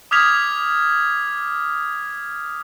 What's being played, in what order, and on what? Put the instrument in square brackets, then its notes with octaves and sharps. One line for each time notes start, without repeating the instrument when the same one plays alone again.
[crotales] D6 D#6 F6 G#6 B6 F7